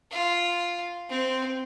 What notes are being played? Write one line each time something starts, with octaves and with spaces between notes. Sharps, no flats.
F4
C4